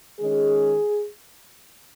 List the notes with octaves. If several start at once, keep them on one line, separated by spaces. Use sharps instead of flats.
D#3 G#3 C#4 G#4